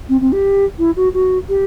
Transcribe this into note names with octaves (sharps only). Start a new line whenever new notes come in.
C4
C4
G4
E4
F#4
F#4
G4